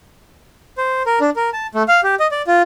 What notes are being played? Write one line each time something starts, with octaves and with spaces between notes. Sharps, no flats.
C5
A#4
D4
A#4
A5
A3
F5
G4
D#5
D5
F4